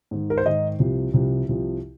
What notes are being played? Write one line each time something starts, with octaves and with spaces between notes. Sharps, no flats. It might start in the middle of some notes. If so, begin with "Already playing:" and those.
G#2 D#3
A#4
C5
G#2 D#3 D#5
C2 C3 F3
C2 C3 F3
C2 C3 F3